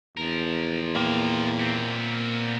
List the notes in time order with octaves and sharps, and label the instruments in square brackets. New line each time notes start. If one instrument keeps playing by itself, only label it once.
[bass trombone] E2 [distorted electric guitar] F3 A#4
[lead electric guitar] A#2 G5 [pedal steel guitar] A#3
[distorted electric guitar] B3 C4